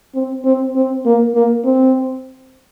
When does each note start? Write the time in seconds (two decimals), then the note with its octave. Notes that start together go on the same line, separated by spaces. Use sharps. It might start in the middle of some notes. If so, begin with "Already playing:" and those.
0.15 C4
0.45 C4
0.76 C4
1.06 A#3
1.35 A#3
1.65 C4